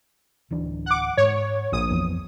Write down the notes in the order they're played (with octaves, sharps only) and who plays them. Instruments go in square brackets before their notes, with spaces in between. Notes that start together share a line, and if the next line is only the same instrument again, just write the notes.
[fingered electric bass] D1 E3 D4
[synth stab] F#5 D6
[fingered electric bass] G#2 [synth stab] C#5
[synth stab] A#1 D#6
[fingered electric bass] F2 E3 B3